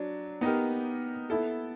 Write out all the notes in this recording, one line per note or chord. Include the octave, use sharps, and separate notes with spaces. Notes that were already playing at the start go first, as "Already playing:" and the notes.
Already playing: F#3 D4
B3 D#4 G4 A#4
B3 E4 A4